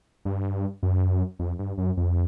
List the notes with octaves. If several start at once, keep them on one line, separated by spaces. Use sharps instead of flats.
G2
F#2
F2
G2
F#2
F2